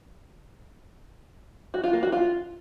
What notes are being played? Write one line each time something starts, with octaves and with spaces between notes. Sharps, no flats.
F#4
F4
A#3
F#4
F4